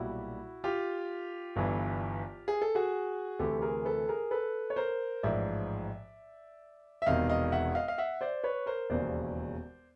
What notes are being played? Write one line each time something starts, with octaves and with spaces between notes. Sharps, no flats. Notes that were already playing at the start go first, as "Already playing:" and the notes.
Already playing: B1 A#2 G3 E4 F#4
F4 G4
G1 G2 E3
G#4
A4
F#4 G#4
D2 C3 E3 G4 A4
G#4 A#4
A4 B4
G#4 A#4
A4 B4
C#5
A#4 C5
A1 G#2 F3 D5 E5
E5
E1 E2 C3 D#3 D#5 F5
D#5 F5
E5 F#5
D#5 F5
F5
E5 F#5
C5 D5
B4 C#5
A#4 C5
E1 D#2 C#3 E3 C5 D5